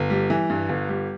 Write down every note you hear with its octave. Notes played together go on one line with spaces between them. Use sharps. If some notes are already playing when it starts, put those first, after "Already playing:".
Already playing: G1
G3
E3
G2
G1
G3